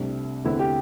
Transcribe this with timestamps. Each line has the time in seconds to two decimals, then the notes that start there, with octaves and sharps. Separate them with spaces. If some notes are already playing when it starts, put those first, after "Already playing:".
Already playing: C2 C3 A3 D4
0.44 E2 D3 A3 C4 E4
0.59 G4